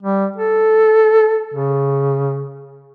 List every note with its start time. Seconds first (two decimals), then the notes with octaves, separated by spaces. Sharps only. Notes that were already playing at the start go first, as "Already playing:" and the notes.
0.03 G3
0.37 A4
1.54 C#3